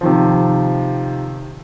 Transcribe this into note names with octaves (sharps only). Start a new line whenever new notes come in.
C3 D#3 F3